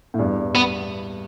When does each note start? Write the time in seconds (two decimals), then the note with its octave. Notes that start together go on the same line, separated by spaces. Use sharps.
0.14 A2
0.19 E2 G2
0.55 B3